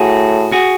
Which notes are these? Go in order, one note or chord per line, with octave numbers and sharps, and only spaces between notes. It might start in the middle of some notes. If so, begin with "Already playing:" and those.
Already playing: A2 F#4 G#4
F#4 G#4